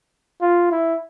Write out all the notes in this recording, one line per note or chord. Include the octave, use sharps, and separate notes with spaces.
F4
E4